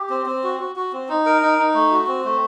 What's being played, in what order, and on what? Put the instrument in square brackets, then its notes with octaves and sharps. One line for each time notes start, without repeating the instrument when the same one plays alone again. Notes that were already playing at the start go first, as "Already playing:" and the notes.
Already playing: [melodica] G4
C4
C4
F#4
F#4
F#4
C4
D#4
A#4
D#4
D#4
A3
F#4
C4
A3